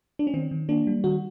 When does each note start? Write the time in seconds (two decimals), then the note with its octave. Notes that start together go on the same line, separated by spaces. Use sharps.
0.19 D4
0.27 C#4
0.34 D#3 C4
0.51 D#3
0.69 A#3 D4
0.87 G3
1.04 D#3 F#4